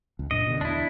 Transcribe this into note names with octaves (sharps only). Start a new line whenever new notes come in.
C#2
F#2 A#2 D4 D#5
B2 D3
A1 E2 D4 E4